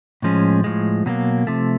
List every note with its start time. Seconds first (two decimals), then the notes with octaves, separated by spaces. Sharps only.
0.22 A2 F3 G#3 C#4
0.64 A2 F3 G#3
1.06 B2 F#3 A#3
1.47 C3 F3 A3